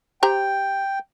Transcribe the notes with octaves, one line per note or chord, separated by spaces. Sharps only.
G4 C5 G5 A#5